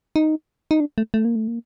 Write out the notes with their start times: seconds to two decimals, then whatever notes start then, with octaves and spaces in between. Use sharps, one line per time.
0.16 D#4
0.71 D#4
0.80 D4
0.98 A3
1.14 A3
1.25 A#3
1.36 A3
1.48 A#3